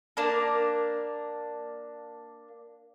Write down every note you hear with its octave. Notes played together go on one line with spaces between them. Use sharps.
A#3 D4 A#4